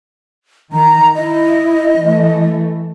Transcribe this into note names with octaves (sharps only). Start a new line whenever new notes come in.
D#3 A#5
E4 D#5
E3 A3